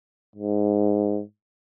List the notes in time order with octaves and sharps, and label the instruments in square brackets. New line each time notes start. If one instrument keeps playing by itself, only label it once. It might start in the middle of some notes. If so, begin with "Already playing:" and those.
[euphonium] G#2